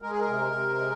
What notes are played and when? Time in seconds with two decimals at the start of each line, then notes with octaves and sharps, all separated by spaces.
0.02 G#3 A#4
0.11 G#4
0.20 A#4
0.27 C3
0.52 C3
0.78 G#3